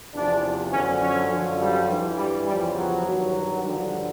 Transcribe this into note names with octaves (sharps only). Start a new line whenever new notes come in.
E2 C3 F3 D4
F#2 D3 F3 C#4
C#4
F#2 D3 F3
G3
G2 E3
G3
E2 C#3 F3 G3
F#3
G2 D#3 F#3
G2 D3 F3 G3